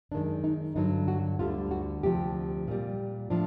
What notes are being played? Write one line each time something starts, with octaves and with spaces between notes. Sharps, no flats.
F#2 D#3 G#3 D4
D#4
G2 D3 F#3 D#4
F#4
D2 D3 G3 F4
F#4
D2 C3 F3 G4
A#2 G3
A2 F3 D4